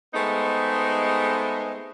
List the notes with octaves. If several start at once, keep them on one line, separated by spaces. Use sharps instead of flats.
G#3 A3 B3 C4 D#4 G#4